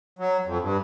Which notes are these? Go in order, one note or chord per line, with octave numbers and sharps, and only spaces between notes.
F#3
F2
G2